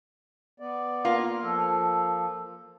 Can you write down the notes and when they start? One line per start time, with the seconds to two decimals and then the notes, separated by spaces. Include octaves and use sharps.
0.60 B3 D5
1.05 A#3 F4
1.43 F3 A4